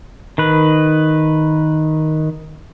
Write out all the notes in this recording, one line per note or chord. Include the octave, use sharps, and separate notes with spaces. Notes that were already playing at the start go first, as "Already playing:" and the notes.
D#3 B4